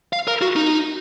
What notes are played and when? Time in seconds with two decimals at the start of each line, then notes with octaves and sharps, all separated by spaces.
0.13 F5
0.28 A#4
0.42 F#4
0.56 D#4